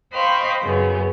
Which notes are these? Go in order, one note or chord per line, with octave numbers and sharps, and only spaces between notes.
C5 D#5 F5 G5 B5 C#6
F#2 C#3 B3 C#4